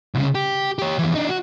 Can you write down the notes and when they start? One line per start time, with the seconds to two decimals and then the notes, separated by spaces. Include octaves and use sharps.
0.15 C2 C#3
0.35 G4
0.79 G4 C#5
0.99 F2 E3
1.15 D4 D#4
1.29 F#4